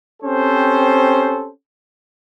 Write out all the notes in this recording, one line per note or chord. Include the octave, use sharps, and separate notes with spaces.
C4 C#4 G4 A4 C5